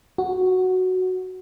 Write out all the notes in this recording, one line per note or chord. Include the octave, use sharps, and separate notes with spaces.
F#4